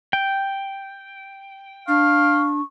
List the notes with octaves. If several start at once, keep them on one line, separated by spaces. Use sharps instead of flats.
G5
D4 F5 C#6